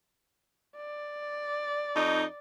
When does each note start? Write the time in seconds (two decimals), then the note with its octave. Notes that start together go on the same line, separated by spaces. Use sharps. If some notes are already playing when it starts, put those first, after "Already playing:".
0.76 D5
1.95 F2 D#4